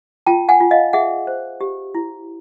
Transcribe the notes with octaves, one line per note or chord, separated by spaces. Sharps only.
F4 G5 A5
F#5 G#5
F4
D#5 F5
G#4 E5 F#5
C5
G4
E4